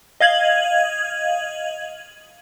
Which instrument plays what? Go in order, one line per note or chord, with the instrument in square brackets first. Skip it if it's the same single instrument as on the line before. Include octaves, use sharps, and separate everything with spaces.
[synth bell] D#5 F5 G#6 F#7